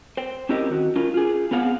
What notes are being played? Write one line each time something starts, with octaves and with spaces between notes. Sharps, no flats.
C5 G5
C4 C#4 E4 G4 A#4 D#5
D#3 F#4
C#4 F4 A#4
F4 G#4
B3 C4 G#4 F5 F#5